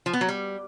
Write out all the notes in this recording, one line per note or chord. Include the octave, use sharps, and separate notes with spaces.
F3
B3
F#3
G3